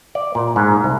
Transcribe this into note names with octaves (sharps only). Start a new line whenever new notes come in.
D5
A#2
G#2
C2